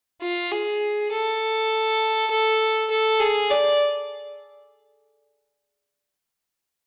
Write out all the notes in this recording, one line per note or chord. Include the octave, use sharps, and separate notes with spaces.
F4
G#4
A4
A4
A4
G#4
D5